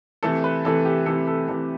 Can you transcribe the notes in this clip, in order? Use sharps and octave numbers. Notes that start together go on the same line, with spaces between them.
C3 E3 A3 A4
B4
C3 E3 A3 A4
G4
C3 E3 A3 A4
A4
C3 E3 A3 A4